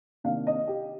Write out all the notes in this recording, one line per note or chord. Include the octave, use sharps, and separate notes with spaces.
C3 D#3 A#3 D4 F5
D#5
G4